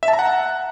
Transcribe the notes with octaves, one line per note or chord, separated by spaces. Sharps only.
E5
A5
A#5
F#5